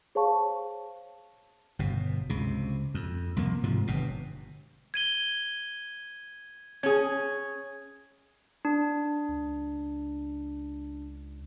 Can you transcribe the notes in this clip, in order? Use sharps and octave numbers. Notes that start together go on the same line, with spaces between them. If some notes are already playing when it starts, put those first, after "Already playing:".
G#4 C5 C#5 F5 A5 C#6
G1 B2
C#2 C3
F2
C2 F3 A#3
G#2 C3 F3
G1 G2 B2
G#6 D#7 G7
C#4 G#4 G#6
D4
C#2